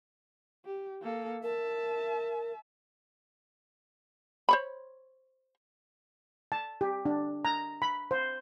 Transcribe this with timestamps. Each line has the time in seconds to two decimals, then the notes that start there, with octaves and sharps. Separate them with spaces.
0.65 G4
1.01 A#3 A4
1.43 A#4 E5 A5
4.49 C5 C#5 B5
6.52 A5
6.81 G4
7.05 D4
7.45 A#5
7.82 B5
8.11 C5